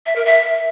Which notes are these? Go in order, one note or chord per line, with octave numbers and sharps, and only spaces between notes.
E5
A#4
E5